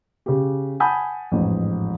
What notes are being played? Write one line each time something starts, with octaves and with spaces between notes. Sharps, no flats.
C#3 G4
F#5 G#5 A5 B5 D#6 G6
A1 F2 G#2